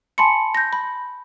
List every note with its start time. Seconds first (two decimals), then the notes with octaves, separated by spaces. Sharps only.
0.18 G#5 A5 B5 C6 C#7
0.55 G6 A#6
0.73 B5